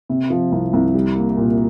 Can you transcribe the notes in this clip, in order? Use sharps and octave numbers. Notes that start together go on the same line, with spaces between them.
C3
F3
C2
C2
G3
A#3
A#2